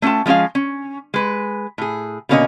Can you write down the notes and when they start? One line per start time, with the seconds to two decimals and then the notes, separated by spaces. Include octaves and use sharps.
0.02 A3 C#4 F4 G5 A5
0.26 F3 G#3 C#4 G#4 F5
0.55 C#4
1.14 G#3 B4
1.78 A2 G#4
2.29 B2 D3 A#3 C#4 F4 D#5